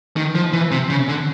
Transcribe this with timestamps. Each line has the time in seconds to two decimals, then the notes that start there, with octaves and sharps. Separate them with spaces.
0.16 D#3
0.35 F3
0.53 E3
0.71 C3
0.90 C#3
1.08 D3